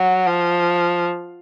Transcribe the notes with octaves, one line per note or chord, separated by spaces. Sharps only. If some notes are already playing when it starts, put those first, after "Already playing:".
Already playing: F#3
F3